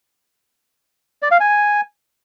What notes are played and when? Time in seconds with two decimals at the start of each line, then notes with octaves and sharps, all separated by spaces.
1.22 D5
1.31 F5
1.40 G#5